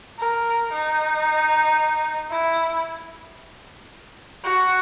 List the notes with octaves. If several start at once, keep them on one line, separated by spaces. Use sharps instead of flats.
A#4
D#4
E4
F#4